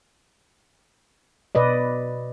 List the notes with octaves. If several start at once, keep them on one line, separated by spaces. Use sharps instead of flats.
B2 B4 D5 D#5